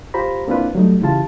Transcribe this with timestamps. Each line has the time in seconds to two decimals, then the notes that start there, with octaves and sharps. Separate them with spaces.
0.14 F4 G4 C5 A#5 B5
0.48 A#3 C4 D4 E4 F4 B4
0.75 F#3 G3 A3 D#4
1.02 C#3 E3 E4 F4 G4 A5